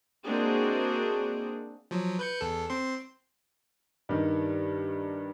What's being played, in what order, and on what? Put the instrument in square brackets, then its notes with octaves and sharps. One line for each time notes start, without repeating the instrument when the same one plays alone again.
[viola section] G#3 A#3 C4 D4 F#4 G#4
[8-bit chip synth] F3 F#3
B4 G6 C#7
E2 A4
C4 C6
[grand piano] G2 D#3 G3